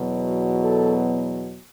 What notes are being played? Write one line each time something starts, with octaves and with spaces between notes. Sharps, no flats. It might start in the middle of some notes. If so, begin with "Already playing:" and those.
Already playing: E2 B2 F#3
A4